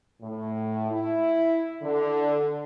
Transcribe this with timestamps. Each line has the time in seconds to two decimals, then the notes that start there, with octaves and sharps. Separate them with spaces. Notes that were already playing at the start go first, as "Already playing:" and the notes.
0.21 A2
0.91 E4
1.82 D3